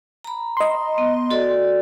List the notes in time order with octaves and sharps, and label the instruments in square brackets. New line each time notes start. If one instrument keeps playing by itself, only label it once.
[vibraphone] A#5 B5
[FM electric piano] D#5 C6
[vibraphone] B3
F#4 A4 D5